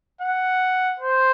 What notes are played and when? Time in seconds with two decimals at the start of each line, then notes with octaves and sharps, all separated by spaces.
0.21 F#5
1.00 C5